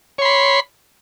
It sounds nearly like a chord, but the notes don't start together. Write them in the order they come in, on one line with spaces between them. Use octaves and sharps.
C#5 C6 B5